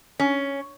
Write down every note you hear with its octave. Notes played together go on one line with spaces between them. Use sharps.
C#4